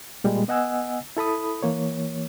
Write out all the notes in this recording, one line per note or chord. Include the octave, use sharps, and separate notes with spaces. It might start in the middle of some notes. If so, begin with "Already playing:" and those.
A#2 G3 G#3
B3 D#5 F#5 G#5 E6
E4 A4 B5 D#6
E3 A#3 C#5